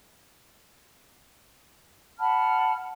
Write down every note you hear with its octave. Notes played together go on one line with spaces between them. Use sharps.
F#5 A5 B5 F6